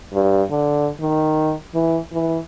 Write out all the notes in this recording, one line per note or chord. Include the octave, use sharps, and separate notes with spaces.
G2
D3
D#3
E3
E3